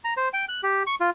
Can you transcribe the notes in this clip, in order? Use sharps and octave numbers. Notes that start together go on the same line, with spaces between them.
A#5
C5
G5
F#6
G4
C#6
F4